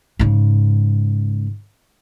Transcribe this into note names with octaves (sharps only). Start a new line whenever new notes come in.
G#2 C#3